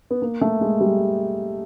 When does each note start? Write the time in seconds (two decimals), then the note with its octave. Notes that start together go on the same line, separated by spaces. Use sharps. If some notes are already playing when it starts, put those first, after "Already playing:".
0.11 B3
0.22 A#3
0.41 A3
0.61 G#3
0.81 G3